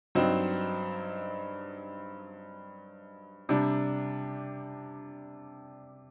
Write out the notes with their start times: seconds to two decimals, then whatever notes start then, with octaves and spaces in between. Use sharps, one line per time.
0.15 G2 F#3 C4 D#4
3.49 C3 G3 D4